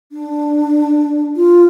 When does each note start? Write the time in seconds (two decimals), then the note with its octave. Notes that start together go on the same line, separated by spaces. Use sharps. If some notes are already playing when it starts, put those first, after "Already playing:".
0.12 D4
1.36 F4